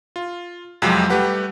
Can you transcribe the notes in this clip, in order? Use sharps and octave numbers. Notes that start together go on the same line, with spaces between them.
F4
F2 C3 F3 F#3 G#3
G3 A3 G4 B4 F#5